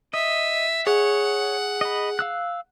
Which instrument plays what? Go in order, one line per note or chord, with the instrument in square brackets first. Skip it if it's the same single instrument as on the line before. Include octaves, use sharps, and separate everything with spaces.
[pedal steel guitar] D#5 [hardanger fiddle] E5
[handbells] G#4 [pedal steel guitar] C#5 [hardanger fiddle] F#5
[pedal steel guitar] D#5 B5
F5 E6 F#6